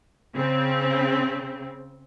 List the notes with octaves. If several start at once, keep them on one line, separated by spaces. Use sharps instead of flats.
C#3 C4